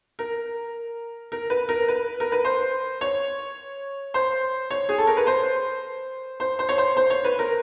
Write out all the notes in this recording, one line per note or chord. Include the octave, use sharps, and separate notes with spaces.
A#4
A#4
B4
A#4
B4
A#4
B4
C5
C#5
C5
C#5
G#4
A4
A#4
B4
C5
C5
C5
C#5
C5
C5
C#5
B4
A#4